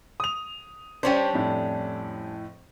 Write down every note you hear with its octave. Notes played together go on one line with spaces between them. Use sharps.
D#6 F7
G3 C#4 D4 C5 C#5 G5
F2 A2